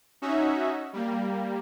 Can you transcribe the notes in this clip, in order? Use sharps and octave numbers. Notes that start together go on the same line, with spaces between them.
C#4 D#4 F#4 E5
G3 A#3